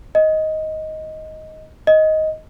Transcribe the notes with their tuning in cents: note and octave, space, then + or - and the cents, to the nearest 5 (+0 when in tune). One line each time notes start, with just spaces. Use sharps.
D#5 +10
D#5 +10